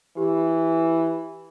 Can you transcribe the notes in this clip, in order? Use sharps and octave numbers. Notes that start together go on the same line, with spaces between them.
E3 G4